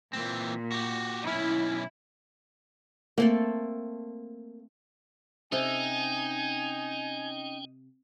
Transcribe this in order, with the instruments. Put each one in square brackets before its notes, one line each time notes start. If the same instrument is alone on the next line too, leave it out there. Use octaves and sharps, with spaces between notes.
[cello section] A#2 [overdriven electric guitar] E3 C4
[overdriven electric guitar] F#4 G4
[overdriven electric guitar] B1 C#4 [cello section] E4
[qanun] A3 C4 A4 [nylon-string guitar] A#3
[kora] C3 A4 [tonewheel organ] C#4 G5 [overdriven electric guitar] D#4 [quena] G#5